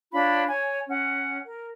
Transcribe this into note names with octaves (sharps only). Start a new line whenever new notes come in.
D4 F4 C#5 B5
C#5 G#5
C#4 F#5
A#4